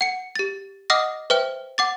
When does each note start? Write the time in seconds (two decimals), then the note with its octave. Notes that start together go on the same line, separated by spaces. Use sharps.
0.01 F#5 C#7
0.36 G4 A6
0.90 D#5 F#5 D6 D#6 F6 A#6
1.30 B4 C5 E5 G5 F6
1.78 F#5 D6 A6